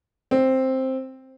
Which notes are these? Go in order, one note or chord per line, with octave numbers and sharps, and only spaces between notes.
C4